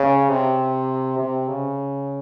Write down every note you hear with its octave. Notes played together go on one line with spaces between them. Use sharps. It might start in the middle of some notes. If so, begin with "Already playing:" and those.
Already playing: C#3
C3
C3
C#3